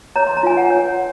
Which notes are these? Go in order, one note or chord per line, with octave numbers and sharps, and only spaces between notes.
C#5 A#5
C6
A#5
F4 G#5
F#5
C#5